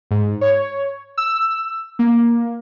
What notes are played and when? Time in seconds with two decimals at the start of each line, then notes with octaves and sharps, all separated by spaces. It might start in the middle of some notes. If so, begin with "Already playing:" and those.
0.11 G#2
0.41 C#5
1.18 E6
1.99 A#3